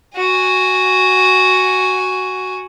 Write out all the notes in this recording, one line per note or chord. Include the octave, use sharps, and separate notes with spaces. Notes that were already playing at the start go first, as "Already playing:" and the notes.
F#4 G#5